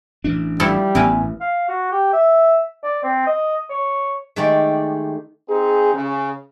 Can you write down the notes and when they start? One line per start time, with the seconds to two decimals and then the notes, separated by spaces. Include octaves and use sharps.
0.24 A1 E3 D4
0.60 F3 G3 E4 A4
0.95 A1 B3 E4 A#4 B4 G#5
1.41 F5
1.69 F#4
1.92 G4
2.13 E5
2.83 D5
3.03 C4
3.27 D#5
3.70 C#5
4.36 D#3 G#3 A3 G4 D5
5.49 C4 D#4 G#4
5.93 C#3